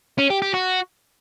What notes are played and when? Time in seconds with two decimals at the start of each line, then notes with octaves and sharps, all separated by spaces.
0.18 C#4
0.30 G4
0.42 G4
0.54 F#4